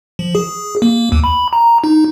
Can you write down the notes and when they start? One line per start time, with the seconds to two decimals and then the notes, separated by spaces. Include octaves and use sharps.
0.19 F3
0.35 G#4
0.82 A#3
1.12 D#2
1.24 B5
1.53 A#5
1.84 D#4